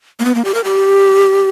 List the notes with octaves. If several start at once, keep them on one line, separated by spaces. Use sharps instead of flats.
A#3
B3
A#3
G4
A#4
G4